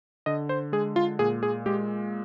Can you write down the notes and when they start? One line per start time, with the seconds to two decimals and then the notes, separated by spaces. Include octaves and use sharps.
0.26 D3 D#5
0.49 C5
0.72 G#3 G#4
0.96 F4
1.19 A#2 G#4
1.43 G#4
1.66 G#3 G4